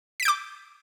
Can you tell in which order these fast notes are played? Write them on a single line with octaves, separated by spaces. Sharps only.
B6 D7 G6 D6